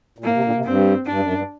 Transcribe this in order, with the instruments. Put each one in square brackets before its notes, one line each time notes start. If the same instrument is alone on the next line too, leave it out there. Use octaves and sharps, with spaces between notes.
[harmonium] A#2
[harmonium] A2 [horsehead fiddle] A#3
[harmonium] C3
A#2 D3
C3
[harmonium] G2 [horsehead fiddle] C4
[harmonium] G2 [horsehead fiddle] D4
[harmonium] F#2
G2